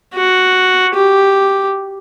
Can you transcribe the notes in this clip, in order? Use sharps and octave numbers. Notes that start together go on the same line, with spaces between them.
F#4
G4